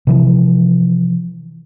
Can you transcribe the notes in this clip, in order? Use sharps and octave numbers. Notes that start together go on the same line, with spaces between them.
C3 E3 F3